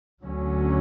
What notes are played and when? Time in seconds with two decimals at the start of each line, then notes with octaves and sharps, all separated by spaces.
0.24 D2 D3 F#3 C#4